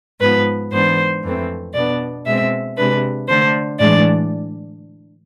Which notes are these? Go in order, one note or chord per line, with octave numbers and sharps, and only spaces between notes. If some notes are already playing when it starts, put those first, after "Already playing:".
G#2 F3 B3 B4
G#2 E3 B3 D4 C5
F2 E3 A3 C4
B2 B3 D4 D5
B2 G#3 C4 E5
C3 G#3 D4 B4
D3 A3 D4 C5
A2 E3 G#3 D4 D5